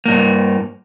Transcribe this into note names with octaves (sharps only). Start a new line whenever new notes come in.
G2 A#3